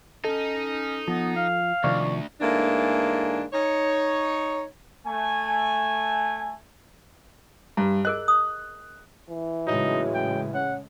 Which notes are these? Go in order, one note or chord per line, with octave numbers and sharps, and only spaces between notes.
C#4 D#4 A4
F3 B3
F5
D2 C3 D#3 F3 D5 C#6
G#2 E3 A3 A#3 D4
D#4 C#5
A3 G#5
G2 A#5
G#4 A#4 D#5 F#6
D#6
E3
A2 C#3 F#3 G#3 D#4
G5
C#4 F#5